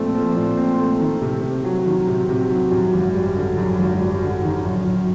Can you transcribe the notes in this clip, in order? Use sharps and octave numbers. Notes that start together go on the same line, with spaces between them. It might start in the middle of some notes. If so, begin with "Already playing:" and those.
Already playing: A#2 F3 A3 C4
F3
A#2
C4
A3
D#3
C3
C3
F#3
D#3
C3
C3
F#3
F#2
G#1
G3
D3
F#2
G#1
G3
D3
D#3
F#2
F#2